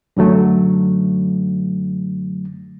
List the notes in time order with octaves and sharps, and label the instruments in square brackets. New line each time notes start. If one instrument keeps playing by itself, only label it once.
[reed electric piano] F#2 D3 F#3 A3